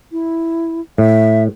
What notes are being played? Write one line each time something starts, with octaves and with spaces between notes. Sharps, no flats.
E4
A2 E5